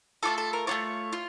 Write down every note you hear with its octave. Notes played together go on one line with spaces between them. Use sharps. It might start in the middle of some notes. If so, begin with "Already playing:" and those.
A3 D4 F4 A4
A4
A#4
A3 D4 F4 C#5
F4